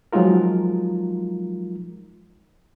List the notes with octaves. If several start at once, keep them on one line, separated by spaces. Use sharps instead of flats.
F3 F#3 G#3 D#4 F4 A#4